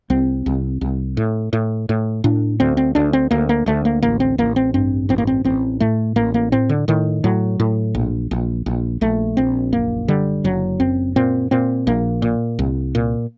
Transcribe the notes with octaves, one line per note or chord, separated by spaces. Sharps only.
C2 C4
C2
C2
A2
A2
A2
A2 D4
D2 C4
C4
D2 D4
C4
D2 A#3
A#3
D2 A3
A#3
A1 A#3
C4
A1 A#3
C4
G2 C4
A1 C4
A#3
C4
A1 C4
A2 A3
A1 A#3
A#3
A2 C4
D3
A2 D#3
A2 F#3
A2
A#1
A#1
A#1
A#1 A3
A#1 C4
F#1 A#3
D3 G3
F#1 F#3
F#2 C4
A#2 C4
A#2 C4
A#1 A#3
A#2
C2
A#2